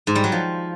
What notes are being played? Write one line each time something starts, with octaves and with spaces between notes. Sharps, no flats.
G#2
G3
F#3
F3